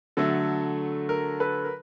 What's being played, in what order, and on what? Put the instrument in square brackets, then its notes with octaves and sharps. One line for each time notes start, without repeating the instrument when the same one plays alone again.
[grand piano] D3 F#3 A3 A4
A#4
A4 B4
A#4